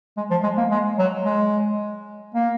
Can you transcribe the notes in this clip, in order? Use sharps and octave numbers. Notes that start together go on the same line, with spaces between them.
G#3
F3
G#3
A#3
G#3
F#3
G#3
A#3